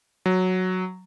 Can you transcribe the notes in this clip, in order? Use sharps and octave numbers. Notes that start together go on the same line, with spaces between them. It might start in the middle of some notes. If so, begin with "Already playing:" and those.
F#3